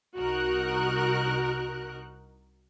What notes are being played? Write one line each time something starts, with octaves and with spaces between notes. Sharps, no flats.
C2 D#4 F#4 A#4 F#6